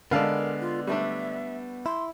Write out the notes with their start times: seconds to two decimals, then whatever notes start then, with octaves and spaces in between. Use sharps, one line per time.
0.11 D3 G#3 B3 A#4 B4 D5 F5 A5
0.60 F4
0.87 G3 A3 D4 E5
1.86 E4 C6